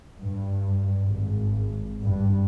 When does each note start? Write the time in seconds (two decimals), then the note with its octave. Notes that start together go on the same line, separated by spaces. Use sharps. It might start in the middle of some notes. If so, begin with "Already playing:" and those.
0.21 G2
1.06 G#1
2.01 G2